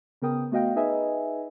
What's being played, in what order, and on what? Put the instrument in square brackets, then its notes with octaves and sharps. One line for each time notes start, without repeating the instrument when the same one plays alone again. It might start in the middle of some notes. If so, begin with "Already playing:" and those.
[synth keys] C#3 B3 A#4 G5 D#6
A3 B3 F#4 D#5 F5 G5
D#4 G#4 B4 D#5 E5 G#5